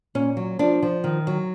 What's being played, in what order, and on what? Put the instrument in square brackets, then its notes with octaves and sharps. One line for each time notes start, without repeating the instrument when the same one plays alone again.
[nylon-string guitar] A#2 C#4
F#3
F3 D4
F3
D#3
F#3